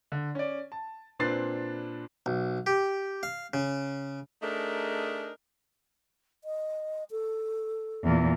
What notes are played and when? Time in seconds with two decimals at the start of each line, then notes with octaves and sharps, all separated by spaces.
0.12 D3
0.35 C#4 D5
0.72 A5
1.19 A#2 C4 D4 B4 A6 C7
2.26 B1
2.66 G4
3.23 F5
3.54 C#3
4.42 A3 D4 D#4 G#4 A#4
6.44 D#5
7.11 A4
8.04 E2 A#2